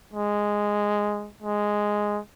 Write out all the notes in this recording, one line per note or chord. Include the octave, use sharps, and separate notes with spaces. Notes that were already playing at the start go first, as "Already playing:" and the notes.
G#3
G#3